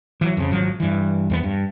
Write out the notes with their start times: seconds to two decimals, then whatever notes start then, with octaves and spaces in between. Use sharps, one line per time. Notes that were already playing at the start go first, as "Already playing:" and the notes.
0.21 E3 F#3
0.37 F2 C#3
0.51 G#1 F3 F#3
0.80 G2 E3
1.30 E2 G#3 B3
1.43 G2